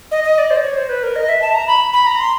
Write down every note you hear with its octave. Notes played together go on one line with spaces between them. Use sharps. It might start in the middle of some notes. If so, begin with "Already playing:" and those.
D#5
D#5
D5
C5
D5
C#5
C5
B4
A#4
D#5
E5
A5
A#5
B5
B5
A#5
C6